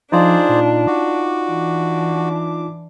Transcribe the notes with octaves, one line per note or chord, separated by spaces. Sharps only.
F3 D4 D#4 F4 G#4 C5 D5
A#2
F#4 D6
E3 D4